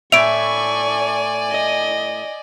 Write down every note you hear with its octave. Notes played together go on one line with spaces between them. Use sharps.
A2 D5 E5 G#5 C#6 D7 F7
D#5